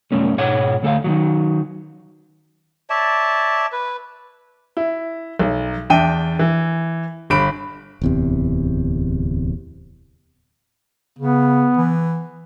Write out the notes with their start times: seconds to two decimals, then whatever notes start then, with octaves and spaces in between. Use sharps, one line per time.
0.12 C2 F#2 A3 C#4
0.38 G#2 B2 C#5 F#5
0.83 D2 A3 A4 F5
1.04 D#3 F3 F#3
2.90 C#5 D5 E5 A5
3.72 B4
4.77 E4
5.39 B1
5.90 E2 D4 E5 G5 D#7
6.39 E3
7.30 G1 B5 D7
8.01 D1 E2 C3
11.19 C#3 B3
11.77 E3